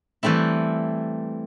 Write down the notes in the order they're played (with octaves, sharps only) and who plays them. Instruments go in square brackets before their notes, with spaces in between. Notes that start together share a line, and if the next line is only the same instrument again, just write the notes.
[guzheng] E3 G3 A3 C4 E4